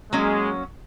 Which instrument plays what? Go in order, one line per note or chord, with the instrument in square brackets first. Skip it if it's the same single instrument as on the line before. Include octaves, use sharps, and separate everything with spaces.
[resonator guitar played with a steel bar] F#3 A#3 C#4 [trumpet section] G#3